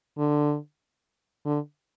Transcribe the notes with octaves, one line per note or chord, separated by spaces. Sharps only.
D3
D3